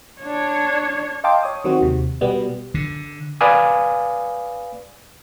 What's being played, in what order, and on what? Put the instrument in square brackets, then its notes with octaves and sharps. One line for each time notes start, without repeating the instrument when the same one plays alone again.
[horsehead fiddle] D4 C#5
[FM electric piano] D#5 F5 G5 A5 C6 D6
C#5 D#6
D#3 F#3 C4 F#4
D#2 C3
B2 G3 B3
[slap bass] D3
[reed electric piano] B4 D5 F5 G#5 D#6